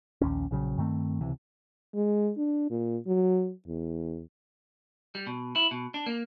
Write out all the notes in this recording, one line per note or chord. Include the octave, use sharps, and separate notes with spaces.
A#1 D#2 C#4
A#1 C#3 F#3
G2 D#3 A3 C4
C#2 C3 E3
G#3
D4
A#2
F#3
E2
G3
B2
E4
B2
D4
A#3